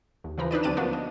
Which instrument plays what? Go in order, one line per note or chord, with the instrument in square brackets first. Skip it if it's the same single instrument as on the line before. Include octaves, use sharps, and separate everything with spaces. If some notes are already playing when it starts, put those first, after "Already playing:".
[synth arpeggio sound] D#2
C#3 E3 F3 B4 A#5
D4 D#4 B4 D5
D2 F#3 C4 D5 A5 D#7
F3 A#3 B3 D4 F#4
D#5